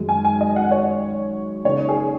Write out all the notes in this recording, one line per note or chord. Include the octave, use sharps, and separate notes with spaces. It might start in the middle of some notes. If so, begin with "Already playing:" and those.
Already playing: F#2 D#3 G#3 D#4
G#5
G#5
D#5
F#5
C#5
C#3 A#3 D#4 C#5
G#4